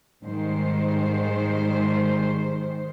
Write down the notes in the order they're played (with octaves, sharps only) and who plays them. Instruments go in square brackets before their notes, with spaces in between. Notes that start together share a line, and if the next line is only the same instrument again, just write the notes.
[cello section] G#2 D#3 G3 G#3 C5